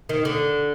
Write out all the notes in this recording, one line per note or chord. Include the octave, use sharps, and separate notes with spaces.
D#3
D3